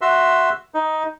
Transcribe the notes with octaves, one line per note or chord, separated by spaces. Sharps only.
F#4 E5 C6
D#4